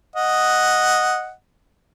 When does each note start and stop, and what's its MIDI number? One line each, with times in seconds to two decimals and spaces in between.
0.16 1.31 75
0.16 1.31 78